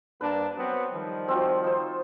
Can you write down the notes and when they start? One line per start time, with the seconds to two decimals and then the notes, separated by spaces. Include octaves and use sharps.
0.21 G2 A#3 D4 B4 A5
0.57 F#3 B3 C4
0.94 D#3 F3 G3
1.28 C4 F4 F#4
1.64 D#4 C5